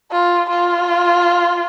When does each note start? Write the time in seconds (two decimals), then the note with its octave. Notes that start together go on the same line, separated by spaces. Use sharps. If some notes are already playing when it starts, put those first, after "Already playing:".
0.12 F4
0.50 F4